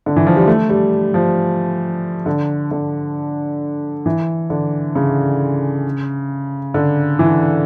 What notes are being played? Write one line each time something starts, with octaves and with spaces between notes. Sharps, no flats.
D3
E3
F3
G3
A3
G3
F3
D3
D3
E3
D3
C#3
D3
E3